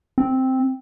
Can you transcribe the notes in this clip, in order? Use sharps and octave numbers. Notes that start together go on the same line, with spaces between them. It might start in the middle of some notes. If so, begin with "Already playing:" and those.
C4